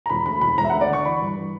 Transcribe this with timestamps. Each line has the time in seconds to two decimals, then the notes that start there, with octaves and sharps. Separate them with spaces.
0.06 A#5
0.10 E1 B5
0.26 D2 B5
0.41 E1 B5
0.58 E1 A#5
0.64 E5
0.70 D2 F#5
0.81 D5
0.89 D3 C#6
1.05 E3 B5
1.21 G2
1.37 E3